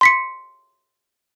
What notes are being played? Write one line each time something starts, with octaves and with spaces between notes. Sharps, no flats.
C6 B6 C#7